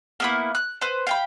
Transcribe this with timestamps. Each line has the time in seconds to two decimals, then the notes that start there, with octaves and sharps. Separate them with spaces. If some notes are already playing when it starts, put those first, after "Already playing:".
0.20 A#3 B3 E4
0.55 F#6
0.81 B4 C5
1.07 F5 G5 B5